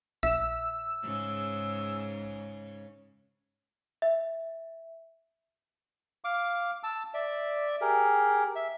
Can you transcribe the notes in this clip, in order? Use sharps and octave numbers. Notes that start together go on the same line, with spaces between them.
A#1 E5 E6
G#2 C#3
E5
F5 D6
A5 E6
D5 E5
G4 G#4 A#4
E5